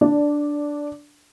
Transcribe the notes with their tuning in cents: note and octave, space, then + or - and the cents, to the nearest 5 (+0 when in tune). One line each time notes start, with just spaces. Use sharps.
D4 +0 D5 -10